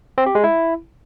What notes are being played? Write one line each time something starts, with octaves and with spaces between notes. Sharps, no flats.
C4
G4
G#3
E4